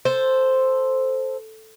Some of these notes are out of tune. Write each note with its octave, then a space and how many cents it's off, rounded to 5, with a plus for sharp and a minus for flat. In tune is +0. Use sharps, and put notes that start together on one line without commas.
A4 +0 C5 +0